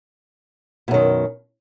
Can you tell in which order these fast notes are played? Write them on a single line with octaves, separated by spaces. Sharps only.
B2 F#2 D#3